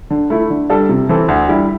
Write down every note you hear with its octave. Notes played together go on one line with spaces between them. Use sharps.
D3
A3 E4
D3
G3 D4 A4
C3
E3 C4 A4
D2
D3 G3 E4 G4